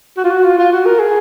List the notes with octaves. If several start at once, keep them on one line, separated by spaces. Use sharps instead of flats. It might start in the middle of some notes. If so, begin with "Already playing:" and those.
F#4
F4
F#4
F4
F4
F#4
A#4
G#4